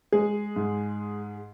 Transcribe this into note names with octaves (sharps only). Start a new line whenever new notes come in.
G#3 G#4
G#2